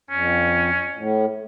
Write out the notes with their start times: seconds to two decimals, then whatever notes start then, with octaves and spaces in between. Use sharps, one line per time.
0.10 F2 C#4
0.96 A2